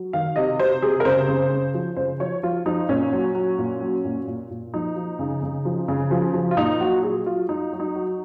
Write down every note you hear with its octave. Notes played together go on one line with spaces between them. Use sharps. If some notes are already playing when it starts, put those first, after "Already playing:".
Already playing: F#3
D#3 F5
C3 D#5
C3 C5
C3 G#4
A#4
C#3 C5
C#3
C#3
F3
C#3 C5
F3 C#5
F3 F4
F3 D#4
A#2 C#4
F#3
F#3
A#2
F#3
A#2
A#2
A#2
F3 D#4
F3
C#3
C#3
F3
C#3
F3
F3
F4
A#2 D#4
F#3 F#4
F#3 G#4
F#3 F4
F#3 D#4
F#3
D#4
F#3